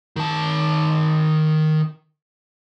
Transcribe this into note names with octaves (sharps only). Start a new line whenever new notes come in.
D#3 A5